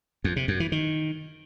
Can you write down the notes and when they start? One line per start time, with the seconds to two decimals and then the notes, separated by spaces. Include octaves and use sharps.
0.24 F2
0.36 C3
0.48 F#2
0.60 E3
0.72 D#3